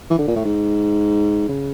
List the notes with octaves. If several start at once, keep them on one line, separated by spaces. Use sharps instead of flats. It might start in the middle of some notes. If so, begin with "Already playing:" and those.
E3
D3
A#2
A2
G#2
C#3